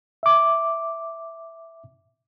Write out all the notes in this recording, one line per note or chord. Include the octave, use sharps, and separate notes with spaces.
E5 D6